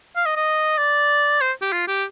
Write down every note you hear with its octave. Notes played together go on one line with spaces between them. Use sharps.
F5
D#5
D#5
D5
C5
G4
F4
G4